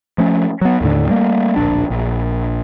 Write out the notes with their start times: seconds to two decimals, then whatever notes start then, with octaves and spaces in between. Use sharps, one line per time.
0.18 F3 A3 C#4
0.61 F#3 B3
0.81 D#2 A2 D3
1.09 G3 A3 A#3
1.56 D1 A#1 D4
1.90 A#1